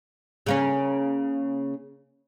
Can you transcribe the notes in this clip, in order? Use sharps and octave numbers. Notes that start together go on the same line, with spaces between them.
C#3 A#3 C#4